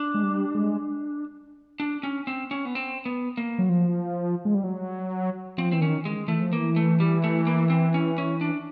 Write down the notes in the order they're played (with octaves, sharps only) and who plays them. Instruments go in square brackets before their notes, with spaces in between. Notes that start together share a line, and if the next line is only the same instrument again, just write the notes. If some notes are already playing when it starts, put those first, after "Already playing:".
Already playing: [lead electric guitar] D4
[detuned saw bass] G#3
G3
G#3
[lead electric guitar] D4
C#4
C4
C#4
B3
C4
B3
A#3
[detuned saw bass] F#3
F3
G#3
G3
F#3
[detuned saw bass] F3 [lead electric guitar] C4
[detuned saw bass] E3 [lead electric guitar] C4
[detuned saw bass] D#3 [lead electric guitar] C#4
[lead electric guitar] G#3
[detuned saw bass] E3 [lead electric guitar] A3
[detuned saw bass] F3
[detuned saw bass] E3 [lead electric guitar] A#3
[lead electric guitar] A3
G3
A3
A#3
C4
C#4
C#4
D4